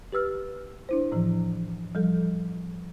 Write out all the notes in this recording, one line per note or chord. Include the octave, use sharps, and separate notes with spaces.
G4 B4 E6 F6
D4 E4 C5
A2 E3 F3
F3 G3 A4